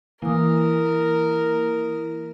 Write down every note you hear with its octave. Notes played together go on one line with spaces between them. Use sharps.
E3 A#3 E4 A#4 D#6